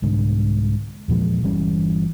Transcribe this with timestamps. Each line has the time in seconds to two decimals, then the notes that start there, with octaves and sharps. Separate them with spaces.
0.02 C2 G#2 D3
1.08 E2 A#2 F3 G#3
1.43 G1 E3 G3 C#4